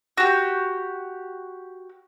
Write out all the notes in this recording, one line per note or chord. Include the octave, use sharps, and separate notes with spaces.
F#4 G4